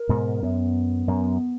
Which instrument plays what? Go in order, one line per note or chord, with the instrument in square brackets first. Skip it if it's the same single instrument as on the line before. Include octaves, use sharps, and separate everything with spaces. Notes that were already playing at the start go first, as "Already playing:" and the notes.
Already playing: [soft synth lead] A#4
[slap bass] G#2 B2
[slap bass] F#2 [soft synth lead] B3
[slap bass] F#2